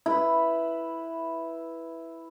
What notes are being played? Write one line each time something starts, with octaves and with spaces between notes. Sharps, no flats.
E4 B4